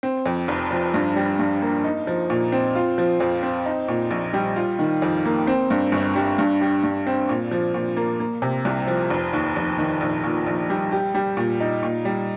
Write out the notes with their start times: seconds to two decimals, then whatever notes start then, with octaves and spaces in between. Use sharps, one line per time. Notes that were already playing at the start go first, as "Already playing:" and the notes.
0.03 C4
0.26 F2
0.48 F1
0.71 F3
0.94 G2
1.16 G3
1.39 G2
1.62 A#3
1.84 D#4
2.07 F3
2.30 A#2
2.52 C4
2.75 F4
2.98 F3
3.20 F2
3.43 C4
3.66 D#4
3.88 A#2
4.11 A#1
4.33 G3
4.56 F4
4.79 D#3
5.02 F2
5.25 A#3
5.47 C4
5.70 G2
5.92 G1
6.15 G3
6.38 G2
6.61 G3
6.83 G2
7.07 C4
7.29 A#2
7.51 F3
7.74 A#2
7.96 A#3
8.20 A#3
8.42 C3
8.65 C2
8.88 F3
9.10 F1
9.33 D#2
9.56 F1
9.78 D#3
10.01 A#1
10.24 A#2
10.47 A#1
10.70 G3
10.92 G4
11.14 G3
11.37 A#2
11.60 D#4
11.83 A#2
12.05 G3